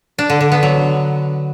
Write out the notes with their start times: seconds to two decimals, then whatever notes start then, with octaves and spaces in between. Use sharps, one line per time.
0.19 D4
0.30 D3
0.41 D3
0.52 B3
0.63 F#3